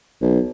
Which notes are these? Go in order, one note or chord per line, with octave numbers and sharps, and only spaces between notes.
B1